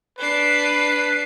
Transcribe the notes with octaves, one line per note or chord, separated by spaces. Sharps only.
D4 B4 C7